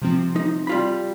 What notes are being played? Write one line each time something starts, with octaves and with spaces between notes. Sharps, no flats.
C3 F3 C4
D#4
G3 F4 B5